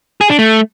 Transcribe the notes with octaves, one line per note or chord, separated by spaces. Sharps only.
G#4
D4
A3